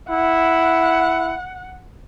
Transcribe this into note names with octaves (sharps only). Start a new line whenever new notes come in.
E4 F#5